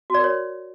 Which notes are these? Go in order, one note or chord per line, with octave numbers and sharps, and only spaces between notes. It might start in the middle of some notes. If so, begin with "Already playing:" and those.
F#4 A#4 C#5 D5